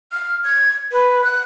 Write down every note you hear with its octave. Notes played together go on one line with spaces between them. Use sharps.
F6
G#6
B4
F#6